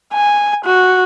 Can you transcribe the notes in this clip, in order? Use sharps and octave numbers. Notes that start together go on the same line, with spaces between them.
G#5
F#4